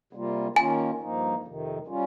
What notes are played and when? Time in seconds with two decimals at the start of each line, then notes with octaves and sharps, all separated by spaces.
0.13 C3 G3 A#3 F4
0.56 D#3 A#3 C#4 F4 G#5
1.00 G2 F3 A#3 D#4
1.44 F2 C3 D#3
1.87 G3 C#4 F4